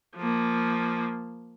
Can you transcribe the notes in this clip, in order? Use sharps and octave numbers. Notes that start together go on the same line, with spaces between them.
F3 A#3